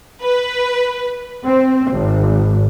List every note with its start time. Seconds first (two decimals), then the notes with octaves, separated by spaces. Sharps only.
0.23 B4
1.44 C4
1.92 G#1